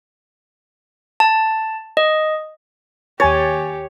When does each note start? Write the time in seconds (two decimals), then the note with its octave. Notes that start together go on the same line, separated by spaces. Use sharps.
1.20 A5
1.97 D#5
3.20 D#2 G4 C#5 G#5 A6